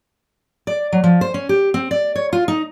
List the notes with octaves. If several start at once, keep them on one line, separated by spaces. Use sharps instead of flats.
D5
F#3
F3
C5
C#4
G4
C4
D5
C#5
F4
D#4